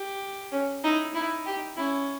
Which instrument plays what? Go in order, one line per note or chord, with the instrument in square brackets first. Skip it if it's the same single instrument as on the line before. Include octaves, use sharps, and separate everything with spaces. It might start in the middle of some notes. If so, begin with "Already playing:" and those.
Already playing: [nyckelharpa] G4
[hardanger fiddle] C#4
[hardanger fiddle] D#4 [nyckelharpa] E4
[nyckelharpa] D#4 [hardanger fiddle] E4
[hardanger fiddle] G4
[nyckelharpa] C#4 [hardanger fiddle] E4